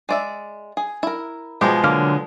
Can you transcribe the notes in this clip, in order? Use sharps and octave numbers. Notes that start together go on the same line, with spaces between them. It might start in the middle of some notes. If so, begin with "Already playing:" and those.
G#3 D5 E5
G#4
E4 A#4
B2 F3 G#3 G4 A#5
D3 F#3 A#3 F6